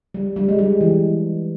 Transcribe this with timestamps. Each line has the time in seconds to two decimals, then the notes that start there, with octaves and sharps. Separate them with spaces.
0.14 G3
0.36 G3
0.48 G#3
0.59 G3
0.81 E3